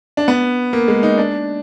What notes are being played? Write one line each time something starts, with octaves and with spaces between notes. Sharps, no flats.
D4
B3
A#3
G#3
D#4
D4